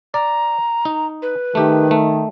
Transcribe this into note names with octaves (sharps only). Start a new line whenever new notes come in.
D5 A#5
D#4
B4
D#3 A3 G4
A3